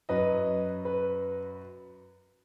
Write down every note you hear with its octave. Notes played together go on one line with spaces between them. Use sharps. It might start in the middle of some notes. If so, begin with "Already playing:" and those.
F#2 F#3 B4 D#5
B4